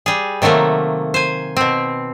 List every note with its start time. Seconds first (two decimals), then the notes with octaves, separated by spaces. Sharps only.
0.06 G3 G#4
0.42 C3 D#3 F#3 A3 A#3
1.14 C5 G#5
1.57 B2 C4